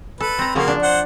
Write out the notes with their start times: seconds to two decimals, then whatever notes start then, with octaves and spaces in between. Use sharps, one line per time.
0.20 A4 B4
0.39 C4 A#5
0.55 C#3 F3 A#3 C#4 F#4
0.68 D4
0.82 C5 F#5